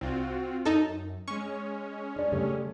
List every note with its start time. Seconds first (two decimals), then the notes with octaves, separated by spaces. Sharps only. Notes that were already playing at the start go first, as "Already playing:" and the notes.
0.01 C2 C4 F4 F#4
0.65 F#2 D#4 A4
1.28 G#3 C#4 C#6
2.16 D4 D5
2.32 C#3 G3 A3